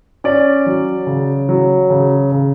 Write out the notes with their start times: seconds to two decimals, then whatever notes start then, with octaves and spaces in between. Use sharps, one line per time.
0.24 C#4 D5
0.66 F#3
1.07 C#3
1.49 F#3
1.90 C#3
2.32 C#3